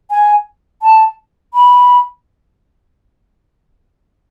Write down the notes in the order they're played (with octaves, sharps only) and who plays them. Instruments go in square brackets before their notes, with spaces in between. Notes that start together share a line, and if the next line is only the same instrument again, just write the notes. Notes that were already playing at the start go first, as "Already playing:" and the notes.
[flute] G#5
A5
B5